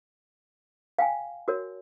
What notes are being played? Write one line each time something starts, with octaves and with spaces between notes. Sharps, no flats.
F5 G5 G#5
F#4 A#4 C#5